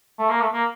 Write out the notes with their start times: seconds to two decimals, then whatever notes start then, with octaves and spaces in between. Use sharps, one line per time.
0.19 A3
0.30 A#3
0.41 A3
0.53 A#3